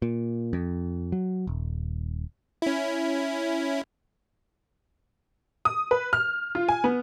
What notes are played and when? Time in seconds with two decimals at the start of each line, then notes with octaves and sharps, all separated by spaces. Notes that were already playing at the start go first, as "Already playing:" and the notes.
0.02 A#2
0.53 F2
1.12 F#3
1.47 D#1
2.62 C#4 E4
5.65 D#6
5.91 B4
6.13 F6
6.55 F4
6.68 G#5
6.84 B3